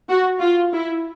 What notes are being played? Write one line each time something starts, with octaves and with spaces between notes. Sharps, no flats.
F#4
F4
E4